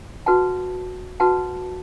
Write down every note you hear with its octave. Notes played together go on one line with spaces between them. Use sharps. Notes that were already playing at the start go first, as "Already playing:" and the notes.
F#4 B4 F#5 A5
F#4 B4 F#5 A5